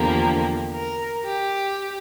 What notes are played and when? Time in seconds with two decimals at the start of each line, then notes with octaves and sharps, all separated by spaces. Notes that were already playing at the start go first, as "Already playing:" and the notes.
Already playing: E2 D3 F3 A#3 G4
0.73 A#4
1.24 G4